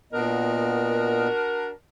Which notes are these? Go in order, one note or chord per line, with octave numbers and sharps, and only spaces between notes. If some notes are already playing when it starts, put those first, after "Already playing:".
A#2 B3 D4 F#4 A#4 D#5